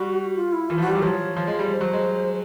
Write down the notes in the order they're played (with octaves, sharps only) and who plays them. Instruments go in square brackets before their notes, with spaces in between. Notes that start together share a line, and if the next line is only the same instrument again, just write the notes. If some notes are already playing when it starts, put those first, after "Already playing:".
Already playing: [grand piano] G3 [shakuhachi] F#4
[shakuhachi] F4
E4
[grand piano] E3 [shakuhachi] F4
[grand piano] F3
[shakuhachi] F#4
[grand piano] G3
[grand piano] F#3 [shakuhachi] G4
[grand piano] F3 [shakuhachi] C#5
[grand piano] F3
G#3
G3
[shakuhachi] C5
[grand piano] F#3
G#3